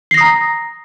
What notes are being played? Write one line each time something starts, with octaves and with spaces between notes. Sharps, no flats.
A#5 D#6 A#6 C7